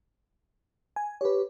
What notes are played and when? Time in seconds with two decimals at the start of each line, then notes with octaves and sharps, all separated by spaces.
0.96 G#5
1.21 G4 B4 C#5